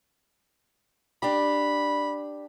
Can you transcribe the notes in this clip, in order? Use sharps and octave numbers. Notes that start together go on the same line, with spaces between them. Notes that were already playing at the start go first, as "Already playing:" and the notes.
D4 G4 B5